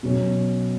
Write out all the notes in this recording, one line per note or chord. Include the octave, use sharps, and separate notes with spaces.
B2 F#3 C#4